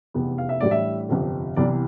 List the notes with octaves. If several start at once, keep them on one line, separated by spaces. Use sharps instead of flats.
F1 E2 C3 E3 B3
F5
E5
A1 A2 G3 D4 D5
E5
G1 F2 C3
C2 C3 E3 B3 D5